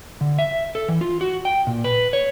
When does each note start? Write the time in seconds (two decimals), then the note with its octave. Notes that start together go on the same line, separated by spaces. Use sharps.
0.21 D3
0.39 E5
0.75 A4
0.88 E3
1.01 F4
1.21 F#4
1.45 G5
1.67 A#2
1.84 B4
2.13 C#5